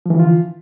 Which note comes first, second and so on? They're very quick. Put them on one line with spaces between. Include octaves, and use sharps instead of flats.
F3 E3 D3 F4